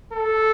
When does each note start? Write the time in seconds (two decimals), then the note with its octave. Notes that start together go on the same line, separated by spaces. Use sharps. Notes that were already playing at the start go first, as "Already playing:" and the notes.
0.13 A4